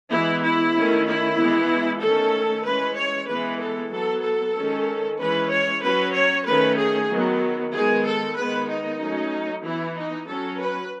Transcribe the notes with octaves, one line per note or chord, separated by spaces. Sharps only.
E3 G#3 B3 E4
E4
D#3 A3 C#4
E4
E3 G#3 B3
D#3 A3 C#4 A4
E3 G#3 C#4 B4
C#5
E3 G#3 B3 B4
A4
F#3 B3 A4
A4
D#3 G#3 C#4
E3 G#3 C#4 B4
C#5
F#3 C#4 B4
C#5
D#3 A3 C#4 B4
G#4
D#3 F#3 B3
D#3 G#3 B3 G#4
A4
D#3 G#3 B3 B4
D#4
F#3 A3 C#4
E3 B3 E4
D#4
F#3 C#4 A4
B4